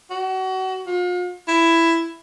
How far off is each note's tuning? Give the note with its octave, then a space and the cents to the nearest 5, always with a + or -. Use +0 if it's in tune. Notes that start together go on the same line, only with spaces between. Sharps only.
F#4 +30
F4 +40
E4 +10